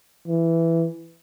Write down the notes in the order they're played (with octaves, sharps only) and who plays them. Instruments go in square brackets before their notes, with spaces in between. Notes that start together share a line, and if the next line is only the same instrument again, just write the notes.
[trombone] E3